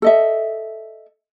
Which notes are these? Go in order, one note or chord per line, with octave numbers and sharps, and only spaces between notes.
A4 D#5 E5